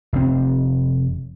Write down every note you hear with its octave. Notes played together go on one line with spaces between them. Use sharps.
F1 C4